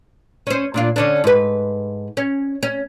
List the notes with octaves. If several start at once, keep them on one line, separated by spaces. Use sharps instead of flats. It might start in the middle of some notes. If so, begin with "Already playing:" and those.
C#4 C5
A#2 D4 F4
D3 C#4 D4
G#2 B4
C#4
C#4